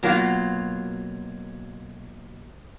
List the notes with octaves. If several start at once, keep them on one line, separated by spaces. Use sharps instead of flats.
B2 F#3 A#3 F4